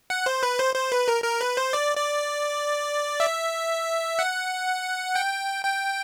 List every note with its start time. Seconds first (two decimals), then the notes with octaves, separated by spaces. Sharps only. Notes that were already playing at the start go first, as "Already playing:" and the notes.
0.10 F#5
0.26 C5
0.43 B4
0.59 C5
0.75 C5
0.92 B4
1.08 A#4
1.24 A#4
1.41 B4
1.57 C5
1.73 D5
1.97 D5
3.20 E5
4.19 F#5
5.15 G5
5.65 G5